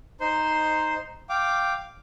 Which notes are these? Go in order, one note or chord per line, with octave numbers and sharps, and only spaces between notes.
D#4 C5 C6
F5 G5 D6